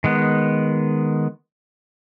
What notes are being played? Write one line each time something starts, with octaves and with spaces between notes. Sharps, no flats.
D#3 G#3 B3